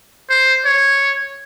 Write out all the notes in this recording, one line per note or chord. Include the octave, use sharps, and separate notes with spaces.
C5
C#5